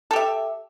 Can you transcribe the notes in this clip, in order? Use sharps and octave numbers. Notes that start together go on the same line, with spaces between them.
G4 A4 E5